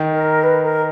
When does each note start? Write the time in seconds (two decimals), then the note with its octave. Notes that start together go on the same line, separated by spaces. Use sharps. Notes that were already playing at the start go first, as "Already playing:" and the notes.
Already playing: D#3
0.12 A#4
0.43 B4
0.64 A#4